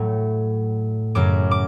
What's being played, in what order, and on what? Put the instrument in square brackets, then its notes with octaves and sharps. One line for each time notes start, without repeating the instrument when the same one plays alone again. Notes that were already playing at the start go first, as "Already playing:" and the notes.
Already playing: [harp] A2 F#3 A3
F#2 C#3 F#3 D6
D6